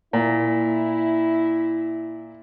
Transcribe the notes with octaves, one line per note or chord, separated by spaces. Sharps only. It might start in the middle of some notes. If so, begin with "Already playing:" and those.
A#2 E4